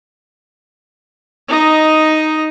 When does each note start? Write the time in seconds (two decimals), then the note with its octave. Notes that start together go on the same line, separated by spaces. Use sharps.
1.48 D#4 D#5